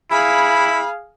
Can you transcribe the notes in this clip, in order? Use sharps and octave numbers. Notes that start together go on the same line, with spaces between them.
E4 G#4 F5 B5